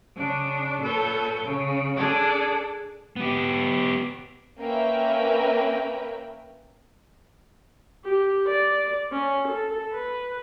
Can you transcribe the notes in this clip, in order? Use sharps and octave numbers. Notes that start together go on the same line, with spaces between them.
C#3 D4
A#2 A4 B4 C#5 G6
C#3
D4 G#4 A4 A5
B3 G4
A#3 C#4 A#4 B4 E5 G5
G4
D5
C#4
A4
B4